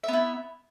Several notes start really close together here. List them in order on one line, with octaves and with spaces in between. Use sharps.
E5 B3 E4